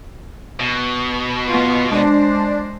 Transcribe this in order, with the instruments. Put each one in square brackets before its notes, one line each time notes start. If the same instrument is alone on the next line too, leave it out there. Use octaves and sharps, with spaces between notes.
[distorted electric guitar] B2
[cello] B3 F4
[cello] G#3 C5 [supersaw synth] D4